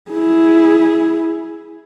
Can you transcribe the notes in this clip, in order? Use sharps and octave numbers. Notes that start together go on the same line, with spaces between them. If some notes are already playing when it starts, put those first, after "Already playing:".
E4 G#4